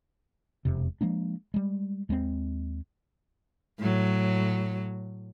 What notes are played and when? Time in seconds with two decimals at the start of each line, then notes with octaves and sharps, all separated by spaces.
0.65 E1 F2 C3
1.01 F3 G#3 A#3 D4
1.54 G3 G#3
2.09 D#2 G#3 A#3 C4
3.79 A2 F#3